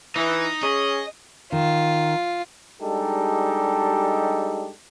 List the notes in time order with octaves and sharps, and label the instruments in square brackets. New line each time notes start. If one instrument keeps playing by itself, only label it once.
[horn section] E3 [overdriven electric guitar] D#4
[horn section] C#4 G#4 [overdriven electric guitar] D#5
[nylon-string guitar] D#3 [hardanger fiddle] F4
[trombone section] G3 G#3 D4 D#4 G4 A4